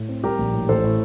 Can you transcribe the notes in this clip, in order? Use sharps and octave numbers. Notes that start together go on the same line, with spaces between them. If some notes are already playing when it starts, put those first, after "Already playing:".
Already playing: A2
C4
G3 G4 A#4
A#1
A2
A1 A4 C5
A2